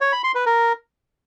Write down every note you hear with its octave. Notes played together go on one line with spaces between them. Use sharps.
C#5
B5
C6
B4
A#4